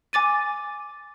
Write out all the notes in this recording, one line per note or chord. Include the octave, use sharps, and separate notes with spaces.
G#5 D6 A6 D#7